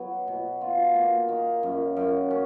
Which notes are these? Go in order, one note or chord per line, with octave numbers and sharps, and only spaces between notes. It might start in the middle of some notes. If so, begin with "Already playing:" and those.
Already playing: F#3 B3
B2
F4
A#3
D#3
F#2
F#2
C#4